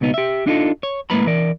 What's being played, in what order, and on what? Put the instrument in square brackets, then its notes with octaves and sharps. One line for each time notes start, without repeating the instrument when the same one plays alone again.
[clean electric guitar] C#2 B2 B3 D#4
G4 E5
D4 D#4 F4 A4
C#5
A2 G#3 A#3 B4 A#5 B5
E3 A#4 D5